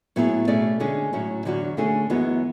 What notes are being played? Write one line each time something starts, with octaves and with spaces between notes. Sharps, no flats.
A2 F#3 B3 E4 G#4
B2 A3 C#4 G#4 D5
D3 G#3 C#4 G#4
A2 F#3 C#4
E2 D3 F#3 C#4 F#4
D3 A3 C#4 G#4
F#2 E3 G#3 B3 F#4